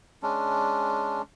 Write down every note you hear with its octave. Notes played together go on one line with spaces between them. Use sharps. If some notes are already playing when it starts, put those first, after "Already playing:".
G#3 C#4 D4